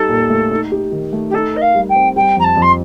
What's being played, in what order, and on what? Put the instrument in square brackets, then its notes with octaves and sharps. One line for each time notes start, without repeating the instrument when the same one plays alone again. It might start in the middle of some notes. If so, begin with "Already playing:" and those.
Already playing: [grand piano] G3 D#4 G4 [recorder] A4
[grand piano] A#2
A3
D#4
G4
D#3
A3
[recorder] G4
[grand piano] D#4 [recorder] A4
[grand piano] A#4 [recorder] D#5
[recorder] F5
[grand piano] G3
[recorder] G5
[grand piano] C4
[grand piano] G3 [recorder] G5
[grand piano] F2 [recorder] A#5
[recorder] A5
[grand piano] F2 [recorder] C6